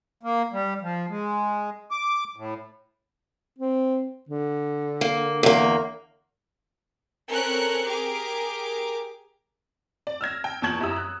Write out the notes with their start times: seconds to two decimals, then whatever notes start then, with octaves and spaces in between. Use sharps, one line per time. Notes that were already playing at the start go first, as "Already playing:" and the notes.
0.23 A#3
0.52 G3
0.82 F3
1.09 G#3
1.91 D6
2.36 A2
3.59 C4
4.29 D3
5.01 A#3
5.43 E2 A#3
7.29 C4 C#4 A4 A#4 F#6 C#7
7.84 G4 G#4 A#4 D6
10.07 D5
10.21 E6 F6 G#6 A#6
10.44 G5
10.62 E2 A#2 A5 C#6 G#6 F#7
10.81 F#2 E4 G4 A#5 D#6 E6
10.96 F#6